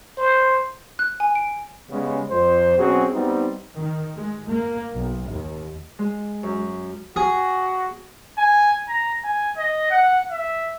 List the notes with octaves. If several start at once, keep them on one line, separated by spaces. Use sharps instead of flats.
C5
F#6
G#5
D7
C#3 G3 G#3 B3 C#4
F2 C5
B2 F#3 C4 C#4 F#4 G#4
G3 B3 C4 D#4
D#3
G#3
A#3
B1
D#2
G#3
F#2
F#4 G#4
G#5
A#5
G#5
D#5
F#5
E5